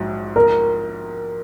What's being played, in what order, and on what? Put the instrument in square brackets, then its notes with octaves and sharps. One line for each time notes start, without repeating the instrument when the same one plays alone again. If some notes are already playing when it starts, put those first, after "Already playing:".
Already playing: [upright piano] A#1 G#2 F#3
[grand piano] A#4